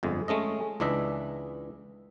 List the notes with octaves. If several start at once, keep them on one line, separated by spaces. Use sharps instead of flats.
G1 F2 G#3
G#3 A3 C#4 D#5
C#2 E3 D4 D#5 E5